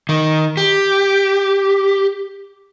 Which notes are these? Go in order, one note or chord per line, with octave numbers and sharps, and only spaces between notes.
D#3
G4